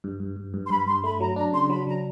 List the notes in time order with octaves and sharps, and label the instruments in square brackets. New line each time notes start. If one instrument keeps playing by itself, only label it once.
[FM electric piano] G2
G2
G2
G2
[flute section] C6
[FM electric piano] G2 [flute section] B5
[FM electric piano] G2 [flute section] C6
[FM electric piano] A3 [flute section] B5
[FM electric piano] F#3 [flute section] A#5
[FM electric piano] D4 [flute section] A#5
[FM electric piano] C#3 [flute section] C6
[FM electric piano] F#3 [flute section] B5
[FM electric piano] F#3 [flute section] A#5